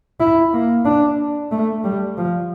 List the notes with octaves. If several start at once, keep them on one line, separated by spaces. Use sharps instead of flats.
E4
A#3
D4
A3
G3
F3